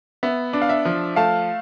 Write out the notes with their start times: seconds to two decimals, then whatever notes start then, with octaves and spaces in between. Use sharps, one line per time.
0.23 B3 E5
0.53 D4
0.62 F5
0.69 E5
0.85 F3
1.16 A3 F5 A5